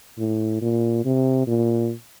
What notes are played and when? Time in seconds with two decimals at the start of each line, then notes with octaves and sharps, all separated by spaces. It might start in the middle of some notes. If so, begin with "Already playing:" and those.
0.19 A2
0.61 A#2
1.05 C3
1.47 A#2